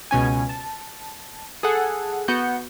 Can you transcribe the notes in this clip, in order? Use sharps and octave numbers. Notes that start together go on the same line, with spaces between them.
C#2 B2 C#4 G#5
A5
G#4 A4 F#5
B3 F#4 G6 C#7